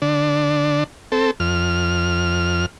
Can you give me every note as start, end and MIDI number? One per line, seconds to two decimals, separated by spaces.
0.02 0.84 50
0.02 0.84 62
1.12 1.31 60
1.12 1.31 69
1.40 2.66 41
1.40 2.66 89